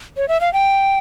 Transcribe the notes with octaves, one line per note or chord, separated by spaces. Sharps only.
C#5
E5
F5
G5